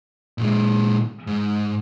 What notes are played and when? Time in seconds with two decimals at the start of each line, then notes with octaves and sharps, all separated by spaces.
0.38 A#2 G#3
1.27 G#2